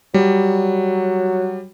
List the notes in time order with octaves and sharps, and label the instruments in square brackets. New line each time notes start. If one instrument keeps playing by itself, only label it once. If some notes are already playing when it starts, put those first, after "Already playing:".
[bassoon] F#3 [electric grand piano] G3